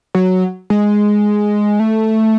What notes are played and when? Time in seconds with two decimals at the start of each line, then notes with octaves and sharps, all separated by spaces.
0.15 F#3
0.70 G#3
1.80 A3